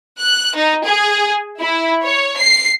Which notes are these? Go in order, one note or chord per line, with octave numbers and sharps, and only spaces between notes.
F#6
D#4
G#4
E4
C#5
C7